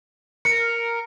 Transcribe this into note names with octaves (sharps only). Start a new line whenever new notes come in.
A#4 C#7